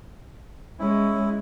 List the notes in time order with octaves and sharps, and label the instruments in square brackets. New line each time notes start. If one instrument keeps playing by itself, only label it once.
[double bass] G#3 C#4 [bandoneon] E4